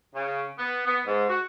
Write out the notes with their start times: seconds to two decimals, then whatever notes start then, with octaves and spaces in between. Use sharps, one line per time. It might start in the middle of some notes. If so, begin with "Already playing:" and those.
0.15 C#3
0.58 B3
0.87 B3
1.07 G#2
1.29 F#4